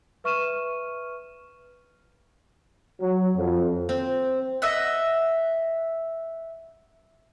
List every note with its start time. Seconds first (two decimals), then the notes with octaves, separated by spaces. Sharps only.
0.24 B4 E5 C#6 F6 D#7 E7
2.99 F#3
3.35 F2
3.89 C4
4.62 D#5 E5 F#5